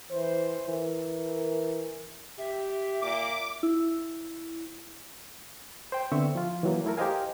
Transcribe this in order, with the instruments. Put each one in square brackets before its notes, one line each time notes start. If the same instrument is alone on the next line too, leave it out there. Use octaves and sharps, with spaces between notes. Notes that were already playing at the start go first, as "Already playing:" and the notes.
[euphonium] E3 [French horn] C5
[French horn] E3 [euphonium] A#4
[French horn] G4 [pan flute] E5
[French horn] A#2 [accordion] D6
[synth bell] E4
[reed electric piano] C5 G5
D3 B3 C4 E5 C#6
F3 F4
E3 F#3 A#3
A3 E4 A4 A#4
G4 A#4 C5 D#5 F5 G#5